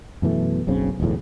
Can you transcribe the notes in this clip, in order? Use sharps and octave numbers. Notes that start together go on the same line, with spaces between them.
F#2 B2 E3 A3
F#1 B1 C#3 C4
D1 B1 E2 A2